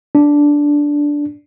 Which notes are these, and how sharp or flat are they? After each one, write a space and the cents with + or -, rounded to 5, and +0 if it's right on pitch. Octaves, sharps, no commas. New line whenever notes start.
D4 -5